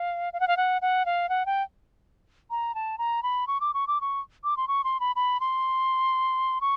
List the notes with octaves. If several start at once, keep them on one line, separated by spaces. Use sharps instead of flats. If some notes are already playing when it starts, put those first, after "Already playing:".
Already playing: F5
F5
F#5
F5
F#5
F#5
F5
F#5
G5
A#5
A5
A#5
B5
C#6
D6
C#6
D6
C#6
D6
C6
C#6
C6
B5
B5
C6
C#6